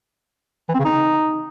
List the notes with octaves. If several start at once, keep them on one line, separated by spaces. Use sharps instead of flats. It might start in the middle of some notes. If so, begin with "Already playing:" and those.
E3
C4
C#3
D#4